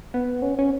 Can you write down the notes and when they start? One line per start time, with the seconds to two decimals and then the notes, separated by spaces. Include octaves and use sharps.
0.14 B3
0.42 C#4
0.59 C#4